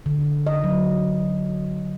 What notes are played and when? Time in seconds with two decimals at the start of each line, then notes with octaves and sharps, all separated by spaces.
0.06 D3
0.47 D#5
0.64 F#3